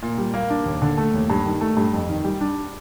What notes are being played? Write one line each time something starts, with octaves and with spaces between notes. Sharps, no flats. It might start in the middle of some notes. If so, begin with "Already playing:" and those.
A#2
G3
A#3
D4
D#2
D3
A3
D#2
G2
D#3
A3
G2
F2
D#3
G3
D4